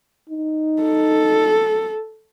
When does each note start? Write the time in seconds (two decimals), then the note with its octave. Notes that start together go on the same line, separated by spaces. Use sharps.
0.30 D#4
0.82 A4